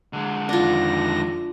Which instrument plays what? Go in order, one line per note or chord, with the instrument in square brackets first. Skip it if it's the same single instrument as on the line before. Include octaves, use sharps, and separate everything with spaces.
[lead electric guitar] D3 G#3
[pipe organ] F2 D#3 A#6 [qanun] D4 F4